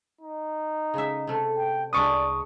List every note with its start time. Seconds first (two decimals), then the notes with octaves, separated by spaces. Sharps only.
0.21 D#4
0.94 C#3 G#3 E5
1.27 C3 A3
1.57 G5
1.93 C2 G#3 D4 B4 D5 C#6 D#6